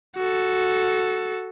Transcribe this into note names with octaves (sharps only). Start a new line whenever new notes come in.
F#4 A4